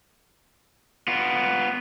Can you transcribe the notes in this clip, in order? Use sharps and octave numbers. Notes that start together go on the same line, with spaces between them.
B3 F4